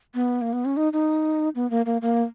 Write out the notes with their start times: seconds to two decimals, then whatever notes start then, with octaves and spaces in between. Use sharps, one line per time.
0.14 B3
0.41 A#3
0.53 B3
0.65 C#4
0.77 D#4
0.93 D#4
1.55 B3
1.70 A#3
1.86 A#3
2.02 A#3